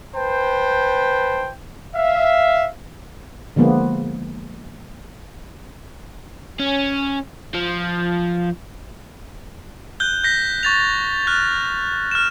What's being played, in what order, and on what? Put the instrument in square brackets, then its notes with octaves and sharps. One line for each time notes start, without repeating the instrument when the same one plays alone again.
[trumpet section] B4 C5 G5 A5
E5 F5
[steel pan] D3 F3 G#3 A#3 B3
[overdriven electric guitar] C#4
F3
[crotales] F#6 G6 G7
G6 A#6 B6
C#6 A6 F7
F6 F#6 A6
F6 E7